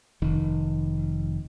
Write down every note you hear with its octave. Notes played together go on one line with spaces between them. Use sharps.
F1 D#3